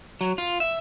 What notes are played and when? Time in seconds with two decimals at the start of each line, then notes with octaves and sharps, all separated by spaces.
0.21 F#3
0.38 F4
0.60 E5